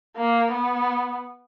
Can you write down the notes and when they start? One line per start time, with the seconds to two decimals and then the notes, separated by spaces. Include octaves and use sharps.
0.16 A#3
0.52 B3